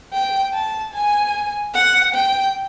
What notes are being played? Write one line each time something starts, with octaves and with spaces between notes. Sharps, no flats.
G5
A5
G#5
F#5
G5